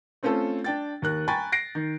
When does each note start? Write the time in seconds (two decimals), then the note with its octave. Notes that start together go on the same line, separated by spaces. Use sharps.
0.23 A3 C4 C#4 F4 A4
0.64 D4 G5 A6
1.02 D#2 A#4 F#6
1.28 G5 G#5 A#5 B5 C#6 A6
1.52 A#6 C7 D7
1.75 D#3